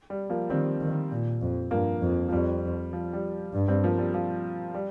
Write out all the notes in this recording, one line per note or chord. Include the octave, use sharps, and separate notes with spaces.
G3
F3 A#3
D#3 G3 C4
D#3
A#2
F2
G2 F3 A#3
F2
F3
F2 G3
F3
G3
G2
G3 C4
F3 A#3
G3
F3
G3